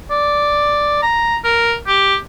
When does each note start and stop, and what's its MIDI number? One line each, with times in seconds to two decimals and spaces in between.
0.11 1.02 74
1.03 1.37 82
1.44 1.74 70
1.87 2.16 67